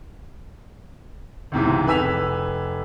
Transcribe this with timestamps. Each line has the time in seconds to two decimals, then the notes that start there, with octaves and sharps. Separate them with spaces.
1.52 C#2 G#2 C3 E3
1.86 F1 B4 G#5 E6 B6 F7